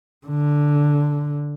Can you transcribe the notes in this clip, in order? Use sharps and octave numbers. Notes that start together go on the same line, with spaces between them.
D3